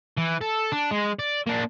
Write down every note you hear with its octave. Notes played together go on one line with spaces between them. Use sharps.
E3
A4
D4
G#3
D5
A#3 D4